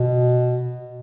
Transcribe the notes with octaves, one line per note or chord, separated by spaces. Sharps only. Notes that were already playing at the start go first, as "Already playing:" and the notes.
Already playing: B2